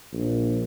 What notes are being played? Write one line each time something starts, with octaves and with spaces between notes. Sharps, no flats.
A#1